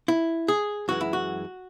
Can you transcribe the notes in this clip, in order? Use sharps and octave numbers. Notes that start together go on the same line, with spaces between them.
E4
G#4
F#2 E3 G#3 F#4
E4
F#4